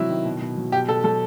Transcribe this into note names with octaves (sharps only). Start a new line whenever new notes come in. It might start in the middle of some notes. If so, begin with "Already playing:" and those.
Already playing: C3 F#3 E4
D#3
B2
B2
F#3
B2 G4
B2 A4
F#3 A4